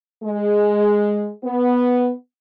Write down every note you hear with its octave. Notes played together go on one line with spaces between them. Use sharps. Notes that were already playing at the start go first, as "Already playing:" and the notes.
G#3
B3